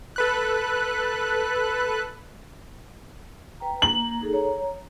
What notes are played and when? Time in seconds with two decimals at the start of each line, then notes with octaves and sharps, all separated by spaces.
0.16 A4 B4 F#6
3.60 B4 G5 A#5
3.82 A#3 A#5 F#7
4.21 D#4 G#4 A4
4.33 C#5 A#5